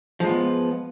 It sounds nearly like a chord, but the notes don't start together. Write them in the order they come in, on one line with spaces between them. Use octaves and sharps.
F3 G#3 F4 B3